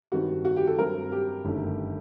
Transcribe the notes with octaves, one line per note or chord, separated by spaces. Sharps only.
G2 D#3 G3 C4 F#4
F#4
G4
A4
G2 F#3 C4 A#4
G4
G1 F#2 D#3 A3